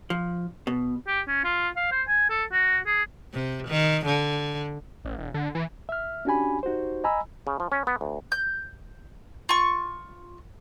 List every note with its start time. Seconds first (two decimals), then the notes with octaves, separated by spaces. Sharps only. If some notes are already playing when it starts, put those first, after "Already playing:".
0.10 F3
0.67 B2
1.07 G4
1.27 C#4
1.44 F4
1.76 F5
1.92 C5
2.08 G#5
2.30 A4
2.52 F#4
2.86 G#4
3.34 C3
3.68 D#3
4.06 D3
5.05 A1
5.19 E1
5.34 D3
5.55 E3
5.89 E5 F6
6.25 C#4 D4 F#4 G4 G#5 B5
6.63 D#4 F#4 G4 C5
7.04 D#5 G#5 A#5 B5 E6
7.47 C#3
7.60 F3
7.72 C#4
7.87 B3
8.01 D2
8.32 G6
9.49 F4 C#6